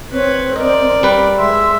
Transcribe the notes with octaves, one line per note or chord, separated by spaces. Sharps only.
C4 B4 C#5
A#4 D5 D#5
G3 B4
G#3 E5 C6